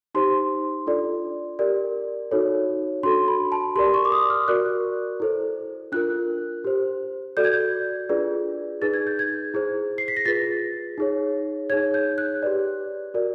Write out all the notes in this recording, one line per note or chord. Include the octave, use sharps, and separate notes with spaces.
D#4 G4 C5 C6
D4 F4 A4 D5
G4 A#4 D5
D#4 F#4 A4 C#5
D4 F#4 A4 C6
B5
A5
G4 A#4 D5 C6
C#6
D6
D#6
F6
F#4 A#4 D5 F#6
E4 A4 C5
D4 F4 A#4 F#6
G4 C5
F#4 A4 D5 G6
G#6
G6
D4 F4 G#4 B4 D5
D#4 G#4 B4 A6
G#6
G6
G#6
E4 G#4 C5
C7
B6
A#6
F4 G#4 B4 A6
D#4 G#4 C#5
D#4 G#4 C#5 G#6
G6
F#6
G4 B4 D5
F#4 A#4 D5